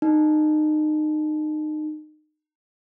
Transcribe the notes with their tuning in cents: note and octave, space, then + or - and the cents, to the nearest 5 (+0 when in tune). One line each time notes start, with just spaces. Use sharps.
D#4 -25